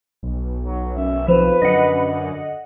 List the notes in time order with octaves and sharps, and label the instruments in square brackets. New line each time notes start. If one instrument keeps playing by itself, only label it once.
[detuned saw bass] B1
[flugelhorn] F#3
[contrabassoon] F#2 [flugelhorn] E5
[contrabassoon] F2 [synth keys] F3 [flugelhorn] B4
[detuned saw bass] F#2 [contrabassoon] D3 [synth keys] D#5 F#5